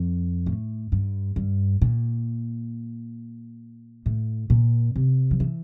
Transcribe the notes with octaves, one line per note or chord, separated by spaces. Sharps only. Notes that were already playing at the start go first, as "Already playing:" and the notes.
Already playing: F2
A2
G2
G2
A#2
A2
A#2
C3
F3
E3